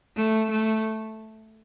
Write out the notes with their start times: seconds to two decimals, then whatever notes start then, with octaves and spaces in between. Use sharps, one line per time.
0.16 A3
0.50 A3